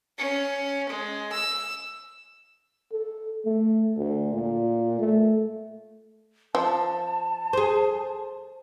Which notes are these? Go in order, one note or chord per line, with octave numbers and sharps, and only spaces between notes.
C#4
G#3
E6
A4
A3
D2
A#2
A3
F3 A5
G#4 C5